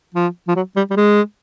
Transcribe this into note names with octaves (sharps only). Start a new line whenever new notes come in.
F3
F3
F#3
G3
G3
G#3